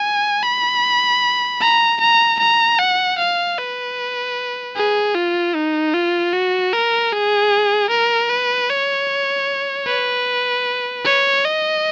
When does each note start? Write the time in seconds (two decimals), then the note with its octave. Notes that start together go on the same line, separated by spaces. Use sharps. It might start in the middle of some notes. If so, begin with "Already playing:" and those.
Already playing: G#5
0.43 B5
1.61 A#5
2.01 A#5
2.40 A#5
2.79 F#5
3.18 F5
3.58 B4
4.76 G#4
5.15 F4
5.55 D#4
5.94 F4
6.33 F#4
6.73 A#4
7.12 G#4
7.90 A#4
8.30 B4
8.70 C#5
9.87 B4
11.05 C#5
11.45 D#5